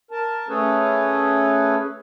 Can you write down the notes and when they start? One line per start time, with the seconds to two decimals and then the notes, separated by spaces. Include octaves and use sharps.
0.11 A#4 A5
0.49 A3 C#4 G#4 A4 B4 C#5